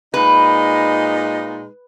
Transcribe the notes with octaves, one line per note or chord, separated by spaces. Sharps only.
A#2 G#3 D#4 B4